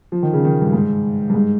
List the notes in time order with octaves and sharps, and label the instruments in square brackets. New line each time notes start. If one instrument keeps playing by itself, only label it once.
[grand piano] F3
D#3
C#3
D#3
G2
G#2
G2
G#2